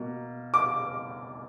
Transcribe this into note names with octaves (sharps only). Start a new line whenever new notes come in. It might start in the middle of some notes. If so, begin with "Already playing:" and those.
Already playing: B2 A#3
D6